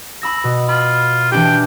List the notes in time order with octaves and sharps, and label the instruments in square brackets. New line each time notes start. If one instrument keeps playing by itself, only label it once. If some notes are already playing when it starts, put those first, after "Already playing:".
[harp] B5 E6 A#6
B2
[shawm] F4 [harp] B5
[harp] E3 D4 G4 [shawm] G5